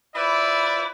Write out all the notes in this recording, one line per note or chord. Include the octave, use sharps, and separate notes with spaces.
E4 F4 B4 C5 D5 E5